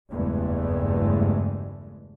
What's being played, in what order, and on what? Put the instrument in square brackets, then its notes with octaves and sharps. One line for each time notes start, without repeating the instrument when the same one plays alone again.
[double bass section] F#1 E2 G2 G#3 A3